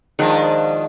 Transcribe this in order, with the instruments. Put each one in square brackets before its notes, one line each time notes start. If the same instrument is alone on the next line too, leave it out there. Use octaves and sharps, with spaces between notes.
[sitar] B2 F3 D4 [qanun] D#3 G#3